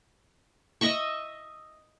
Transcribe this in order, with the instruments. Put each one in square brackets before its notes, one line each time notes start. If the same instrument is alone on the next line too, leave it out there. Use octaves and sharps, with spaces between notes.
[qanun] D#5 E5 C#6